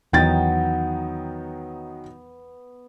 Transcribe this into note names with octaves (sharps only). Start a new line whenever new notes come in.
E2 D#3 F#3 B3 D#4 G5 A6